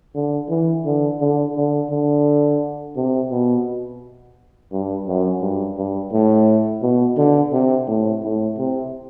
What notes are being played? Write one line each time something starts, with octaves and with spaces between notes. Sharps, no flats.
D3
E3
D3
D3
D3
D3
C3
B2
G2
F#2
G2
G2
A2
B2
D3
C3
A2
A2
C3